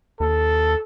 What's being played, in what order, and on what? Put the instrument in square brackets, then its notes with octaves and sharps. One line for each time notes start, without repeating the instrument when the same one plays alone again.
[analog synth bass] D#2 [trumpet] A4